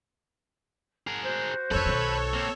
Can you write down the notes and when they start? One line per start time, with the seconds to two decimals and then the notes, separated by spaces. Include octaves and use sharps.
1.07 G#4 A#4 F#5
1.25 F#4 C5
1.71 F2 D3 A4 B4 C#5
1.86 B1 D#3
2.34 A#3 C4